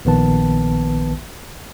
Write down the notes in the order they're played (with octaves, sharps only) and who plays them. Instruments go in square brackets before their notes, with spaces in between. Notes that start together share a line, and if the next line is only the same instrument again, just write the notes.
[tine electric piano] A#1 D#3 B3 B4 A5